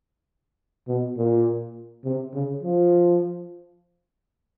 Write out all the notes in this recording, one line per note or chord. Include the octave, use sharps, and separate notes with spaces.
B2
A#2
C3
C#3
F3